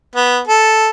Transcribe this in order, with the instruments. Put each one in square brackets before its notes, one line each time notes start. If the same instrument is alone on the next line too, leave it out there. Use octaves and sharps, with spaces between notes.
[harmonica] B3
A4